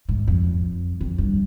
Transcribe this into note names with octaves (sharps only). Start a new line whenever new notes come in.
G#2
F2
F2
G2